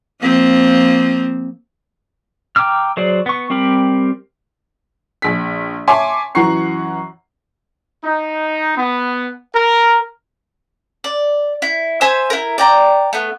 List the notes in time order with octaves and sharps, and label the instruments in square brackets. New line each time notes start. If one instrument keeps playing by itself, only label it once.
[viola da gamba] F3 A#3 C4
[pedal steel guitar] G5 A#5 D6 E6 F6
F#3 G#4 C5 D5
B3 C#6
G3 C4 G4 A#4 B5
[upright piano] A#1 B6
C#5 E5 G#5 A5 C6 D6
F#2 E3 F#5 A#5 C#6 C7
[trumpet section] D#4
B3
A#4
[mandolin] D5
E4
C5 E5 G#5 E6
E4 A#4
D5 G5 A#5
A3 B3